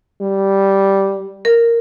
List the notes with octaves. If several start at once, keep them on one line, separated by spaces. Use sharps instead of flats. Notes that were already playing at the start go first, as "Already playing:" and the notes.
G3
A#4